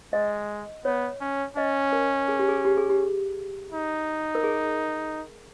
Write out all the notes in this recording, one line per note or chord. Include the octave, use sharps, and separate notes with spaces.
G#3 D#5
B3 C#5
C#4
C#4 D#5
A#4
G#4
G4
G#4
G4
G#4
G4
D#4
A#4
G#4